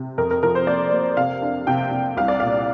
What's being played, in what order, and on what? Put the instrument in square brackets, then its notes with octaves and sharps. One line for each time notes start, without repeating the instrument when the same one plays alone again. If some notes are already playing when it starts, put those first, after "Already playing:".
Already playing: [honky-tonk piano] C3
F2 A#4
A#4
F3 A#4
C5
A#3 D5
A#3
C3 F5
D4
C3 G5
C3
C2 F5
D5
A#2 F5